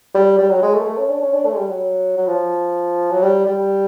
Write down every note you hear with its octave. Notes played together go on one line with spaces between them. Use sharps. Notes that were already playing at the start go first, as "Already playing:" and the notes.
G3
G3
F#3
G#3
A3
A#3
A3
C#4
D4
C#4
D4
A3
G#3
G3
F#3
F#3
F3
F#3
G3
G3